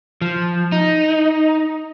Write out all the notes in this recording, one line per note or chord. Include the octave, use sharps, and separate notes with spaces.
F3
D#4